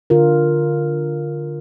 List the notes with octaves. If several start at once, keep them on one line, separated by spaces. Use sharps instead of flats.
D3 F4 A#4